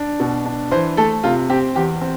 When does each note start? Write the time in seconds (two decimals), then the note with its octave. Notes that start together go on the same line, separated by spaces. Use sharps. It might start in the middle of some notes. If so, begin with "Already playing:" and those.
Already playing: D4
0.20 B2
0.45 D4
0.71 E3 C5
0.97 A3 A4
1.24 C3 F4
1.50 C4 G4
1.76 E2 G4
2.01 C4